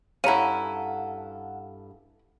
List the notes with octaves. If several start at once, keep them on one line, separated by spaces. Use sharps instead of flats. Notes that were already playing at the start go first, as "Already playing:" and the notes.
G2 C#4 E4 A4 F5 F#5 A#5 D#7